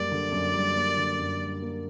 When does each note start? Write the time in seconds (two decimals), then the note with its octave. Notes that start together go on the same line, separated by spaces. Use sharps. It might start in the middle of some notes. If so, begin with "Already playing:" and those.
Already playing: F#2 G3 A#3 D5
0.12 D3
0.32 F#2
0.54 G3
0.76 A#3
0.97 D3
1.19 F#2
1.40 G3
1.62 A#3